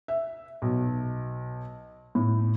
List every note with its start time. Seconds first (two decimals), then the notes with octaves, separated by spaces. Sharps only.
0.08 E5
0.62 B1
2.15 A2